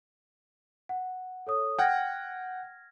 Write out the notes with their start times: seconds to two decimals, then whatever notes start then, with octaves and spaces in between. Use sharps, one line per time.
0.89 F#5
1.47 A4 C#5 D#6
1.79 F#5 G5 F6 G#6 A#6